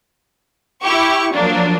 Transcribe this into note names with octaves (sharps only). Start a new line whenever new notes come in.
E4 G4 C#6
F3 F#3 A#3 D4